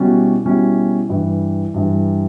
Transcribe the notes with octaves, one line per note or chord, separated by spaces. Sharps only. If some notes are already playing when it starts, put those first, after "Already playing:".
Already playing: B2 G3 C#4 E4
B2 G3 C#4 E4
G2 E3 G3
G2 E3 G3